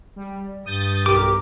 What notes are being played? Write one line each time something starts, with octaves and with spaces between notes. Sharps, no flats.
G3
G2 D#6 G6 A6
B1 G4 A#4 D6